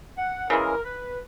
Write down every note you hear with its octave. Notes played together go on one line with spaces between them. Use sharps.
F#5
C#3 E3 G#3 A#4
B4